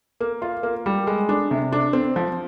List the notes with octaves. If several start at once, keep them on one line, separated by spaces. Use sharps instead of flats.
A#3
F4
A#3
G3
G#3
D4
C3
D4
C4
F3